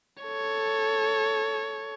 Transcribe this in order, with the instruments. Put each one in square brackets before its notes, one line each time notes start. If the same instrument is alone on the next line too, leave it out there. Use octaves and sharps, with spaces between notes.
[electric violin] A4 C#5